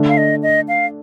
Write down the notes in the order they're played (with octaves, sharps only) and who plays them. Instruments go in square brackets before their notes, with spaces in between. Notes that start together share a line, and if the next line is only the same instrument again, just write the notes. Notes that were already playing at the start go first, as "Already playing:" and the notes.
Already playing: [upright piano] D3 A3 D4
[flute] F5
D#5
D#5
F5